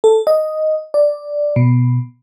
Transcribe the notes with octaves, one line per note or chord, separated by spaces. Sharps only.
A4
D#5
D5
B2